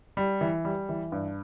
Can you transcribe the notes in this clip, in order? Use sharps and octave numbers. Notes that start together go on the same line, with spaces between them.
G3
E3
G3
E3
G2